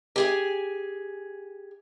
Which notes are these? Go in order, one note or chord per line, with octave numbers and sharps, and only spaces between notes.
G4 G#4 G#5